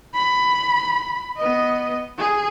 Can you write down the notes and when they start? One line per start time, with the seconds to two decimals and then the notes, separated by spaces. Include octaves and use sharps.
0.14 B5
1.37 B3 D#5
2.18 G#4